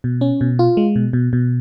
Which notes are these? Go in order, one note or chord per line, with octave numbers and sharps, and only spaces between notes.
B2
C#4
B2
F4
G#3
B2
B2
B2